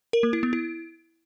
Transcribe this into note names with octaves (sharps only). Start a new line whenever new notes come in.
A#4
A#3
E4
B3
E4